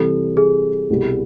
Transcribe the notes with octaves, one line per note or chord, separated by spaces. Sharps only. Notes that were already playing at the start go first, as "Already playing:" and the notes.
Already playing: C3 E3 G3 C4 A4
G#4
C2 B2 G3